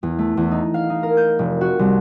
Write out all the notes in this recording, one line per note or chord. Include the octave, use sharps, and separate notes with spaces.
E2
A3
E2
D#4
F5
D#4
A#4
G6
F1
F#4
C2